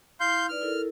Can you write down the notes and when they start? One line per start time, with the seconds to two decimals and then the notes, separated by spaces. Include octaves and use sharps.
0.20 E4 F5 C6 G6
0.48 D#4 B4 D5 F6
0.61 E4 A4 A#4